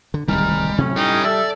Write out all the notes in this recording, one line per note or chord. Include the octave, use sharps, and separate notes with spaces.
D3
D1 C2 D#3 G3 G#3 A#5 F6
A2 C3 F#3 A3 C#4
G3 D#4 A4 G5
A4 D5 E5